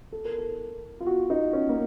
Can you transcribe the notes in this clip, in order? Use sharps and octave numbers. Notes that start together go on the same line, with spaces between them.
A4
A#4
A4
F4
F#4
D#4
C#4
A#3